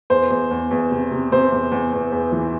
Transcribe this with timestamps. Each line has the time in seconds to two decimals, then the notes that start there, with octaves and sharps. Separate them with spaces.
0.10 E2 C5
0.30 E2
0.51 E2
0.71 E2
0.91 C3
1.11 C3
1.32 C3 C5
1.52 E2
1.72 E2
1.93 E2
2.12 E2
2.32 E3